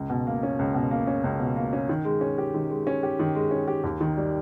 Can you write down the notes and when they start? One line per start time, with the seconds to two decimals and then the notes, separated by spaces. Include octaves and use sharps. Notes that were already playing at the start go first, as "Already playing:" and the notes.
Already playing: C#2
0.10 B2
0.27 A#3
0.43 C#4
0.59 C#2
0.74 B2
0.91 A#3
1.07 C#4
1.24 C#2
1.40 B2
1.56 A#3
1.73 C#4
1.89 D#3
2.05 G#3
2.21 C#4
2.38 G4
2.54 D#3
2.70 G#3
2.87 C#4
3.03 G4
3.19 D#3
3.35 G#3
3.51 C#4
3.68 G4
3.84 D#2
4.01 D#3
4.17 G3